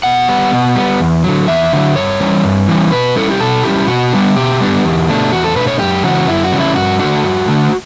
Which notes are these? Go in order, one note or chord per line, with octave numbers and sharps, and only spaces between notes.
B2 F#5
G3 B3
B2
G3 B3
E2
D3 F#3
E2 E5
D3 F#3
G2 C#5
E3 G3 C#4
G2
E3 G3 C#4
B2 B4
G3 C#4 E4 A4
G4
B2 A4
G3 C#4 E4 G4
B2 F#4
G3 B3 D4
B2 G4
G3 B3 D4
E2
B2 A3 D4
E2 F#4
A4
B2 A3 D4 B4
C#5
F#2 G4
C#3 E3 C#4 F#4
F#2 E4
F#4
C#3 E3 G3 C#4
E4
G2 F#4
D3 A3 D4 F#4
G2
D3 A3 D4